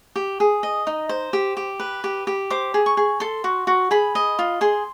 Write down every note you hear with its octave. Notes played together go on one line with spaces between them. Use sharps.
G4
G#4
D#5
D#4
C5
G4
G4
B4
G4
G4
C5 D6
G#4
C#6
G#4
A4 C6
F#4
F#4
G#4 B5
D#5
F4
G#4 C6